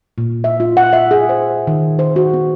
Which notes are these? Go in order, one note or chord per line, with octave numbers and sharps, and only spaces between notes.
A#2
E5
F4
F#5
E5
G#4
C5
D#3
C5
F#4
B3